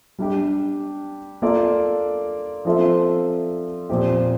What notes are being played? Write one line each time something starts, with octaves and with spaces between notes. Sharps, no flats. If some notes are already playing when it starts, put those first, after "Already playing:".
G3 D4 G4
A#3 F4 A4 D5
F3 C4 F4 A4 E5
A#2 F3 C4 G4